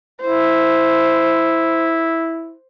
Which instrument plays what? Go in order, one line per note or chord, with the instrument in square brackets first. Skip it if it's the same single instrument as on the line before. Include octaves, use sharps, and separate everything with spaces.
[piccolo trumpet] E4 [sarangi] C5